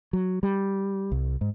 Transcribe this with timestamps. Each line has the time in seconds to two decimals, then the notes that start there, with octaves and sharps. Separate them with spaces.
0.13 F#3
0.43 G3
1.12 C2
1.41 G#2